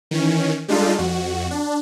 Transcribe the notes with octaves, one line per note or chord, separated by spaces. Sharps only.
D#3 E3 C#4
G3 G#3 D4 D#4 F4 A4
F2 F#4
D4